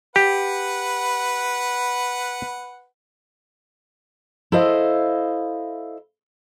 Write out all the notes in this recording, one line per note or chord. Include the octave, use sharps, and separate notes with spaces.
G4 B4 F#5
E4 A4 C5 D#5 F5